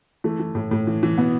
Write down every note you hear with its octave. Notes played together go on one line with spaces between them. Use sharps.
E3 A3
E3
A2
A2
E3
E3
B2 B3